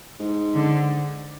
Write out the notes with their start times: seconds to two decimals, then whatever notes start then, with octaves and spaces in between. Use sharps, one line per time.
0.20 G#2
0.55 D3